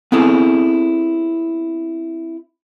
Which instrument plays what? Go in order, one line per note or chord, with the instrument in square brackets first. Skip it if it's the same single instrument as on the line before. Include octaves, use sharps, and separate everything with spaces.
[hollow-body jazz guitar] B3 C4 E4 G#4 A4